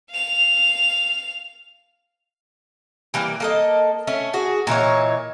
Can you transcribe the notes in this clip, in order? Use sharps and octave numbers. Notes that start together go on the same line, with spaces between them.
F5 F7
E3 G3 A#3
A#3 A4 D#5
A3 C#4
F#4 G#4
A#2 E3 D#4 C#5